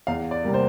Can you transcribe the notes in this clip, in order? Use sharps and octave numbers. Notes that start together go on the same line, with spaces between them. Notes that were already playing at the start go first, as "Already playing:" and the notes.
E2 F5
D5
C3 G3 A#3
C5